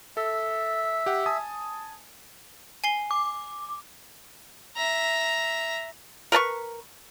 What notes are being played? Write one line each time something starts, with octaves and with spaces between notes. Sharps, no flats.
A4 E5
G4 F#5
G#5 A5 D#6
G#5 C7 G7
D6
E5 A#5
A#4 B4 A5 C#6